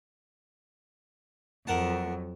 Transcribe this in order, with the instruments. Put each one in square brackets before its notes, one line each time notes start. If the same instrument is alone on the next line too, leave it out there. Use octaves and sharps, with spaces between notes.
[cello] F2 F#3 [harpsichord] A#4 F#5 A5